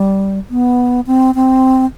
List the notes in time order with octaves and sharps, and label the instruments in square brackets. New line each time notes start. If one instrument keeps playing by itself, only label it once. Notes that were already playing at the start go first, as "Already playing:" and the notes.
Already playing: [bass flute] G3
B3
C4
C4